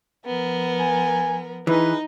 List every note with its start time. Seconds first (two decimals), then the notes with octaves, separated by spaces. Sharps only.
0.25 F3 B3 A#4
0.79 G#5
1.67 E3 D#4 G#4 B4